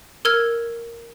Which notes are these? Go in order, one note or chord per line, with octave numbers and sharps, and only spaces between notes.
A#4 E6 F6 G#6